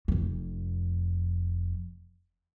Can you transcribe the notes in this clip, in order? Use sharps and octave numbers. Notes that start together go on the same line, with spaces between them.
F1 F2